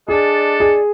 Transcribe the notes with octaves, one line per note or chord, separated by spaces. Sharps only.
G#3 D4 G#4 A4 D5
G#4